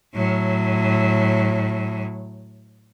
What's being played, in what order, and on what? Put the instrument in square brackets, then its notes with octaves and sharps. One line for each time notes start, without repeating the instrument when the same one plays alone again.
[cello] A2 F#3